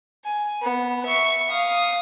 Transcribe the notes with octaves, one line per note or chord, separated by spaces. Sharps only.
G#5
B3
E5 C#6
F5 D#6